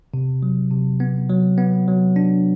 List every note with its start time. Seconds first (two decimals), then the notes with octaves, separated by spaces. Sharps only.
0.14 C3
0.43 F#3
0.71 C3
1.00 B3
1.30 F#3
1.58 B3
1.88 F#3
2.16 D4